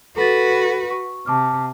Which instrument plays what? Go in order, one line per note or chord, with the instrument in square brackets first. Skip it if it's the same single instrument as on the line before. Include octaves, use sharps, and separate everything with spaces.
[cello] F#4 B4 [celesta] A4 A6
[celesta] C#6
[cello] C3 [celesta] A5 D6 F6